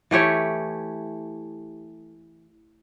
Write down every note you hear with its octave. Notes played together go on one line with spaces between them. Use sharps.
E3 A3 G4 C#5